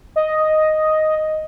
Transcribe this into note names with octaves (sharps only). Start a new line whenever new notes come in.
D#5